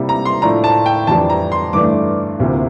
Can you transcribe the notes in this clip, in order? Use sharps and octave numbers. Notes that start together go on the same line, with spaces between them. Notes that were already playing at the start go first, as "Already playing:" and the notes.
Already playing: C3 G3 A#3 E4
A#5
C6
A2 F3 A3 D4 A#5
A5
G5
F2 E3 G3 D4 A5
A#5
C6
G2 E3 A3 D4 D6
D2 C3 F3 A#3 E4